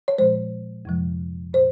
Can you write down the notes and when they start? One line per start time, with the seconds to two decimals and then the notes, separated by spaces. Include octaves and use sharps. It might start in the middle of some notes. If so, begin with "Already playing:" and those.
0.08 C#5
0.18 A#2 F3 G#3 C5
0.85 F2 C3 F3 G#3
1.53 A#2 C5